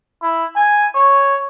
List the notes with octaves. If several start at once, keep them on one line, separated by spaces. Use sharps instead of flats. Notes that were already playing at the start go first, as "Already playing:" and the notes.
E4
G#5
C#5